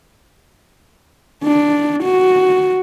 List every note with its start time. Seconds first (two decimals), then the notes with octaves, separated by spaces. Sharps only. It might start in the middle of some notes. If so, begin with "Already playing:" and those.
1.43 D4
2.03 F#4